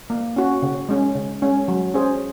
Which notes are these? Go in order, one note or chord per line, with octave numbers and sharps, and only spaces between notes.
A#3
C#4 F#4
C#3
G#3 C#4
C#3
G#3 C#4
F#3
C#4 G#4 C5